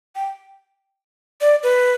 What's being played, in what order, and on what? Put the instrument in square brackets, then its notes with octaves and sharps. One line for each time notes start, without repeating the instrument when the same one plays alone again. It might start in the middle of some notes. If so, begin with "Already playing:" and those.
[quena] G5
D5
B4